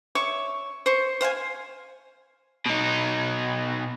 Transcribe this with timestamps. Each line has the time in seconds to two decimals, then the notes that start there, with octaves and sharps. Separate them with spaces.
0.15 C#5 E5 C#6 D6
0.86 C5 C#6
1.21 C5 F5 F#5 G#5
2.66 B2 D#4